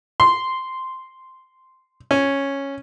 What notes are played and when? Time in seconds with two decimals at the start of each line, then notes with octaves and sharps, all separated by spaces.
0.20 C6
2.11 C#4